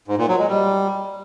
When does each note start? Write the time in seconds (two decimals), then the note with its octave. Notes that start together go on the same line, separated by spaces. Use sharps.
0.08 G#2
0.18 A#2
0.28 F#3
0.39 G#3
0.49 G3